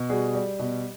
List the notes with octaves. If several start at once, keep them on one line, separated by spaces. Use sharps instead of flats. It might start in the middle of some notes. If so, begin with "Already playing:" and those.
Already playing: B2
G3 F#4 G#4
G3
B2